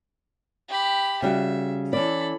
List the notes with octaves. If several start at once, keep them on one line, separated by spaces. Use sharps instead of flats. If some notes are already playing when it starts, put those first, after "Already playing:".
G4 B5
C#3 G3 F#4 E5
E3 C#4 A4 D5 B5